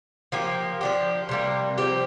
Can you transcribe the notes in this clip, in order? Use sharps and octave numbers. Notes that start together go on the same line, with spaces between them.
F3 A#3 G4
F3 D4 G4
C3 G3 A#3
F3 C4 G4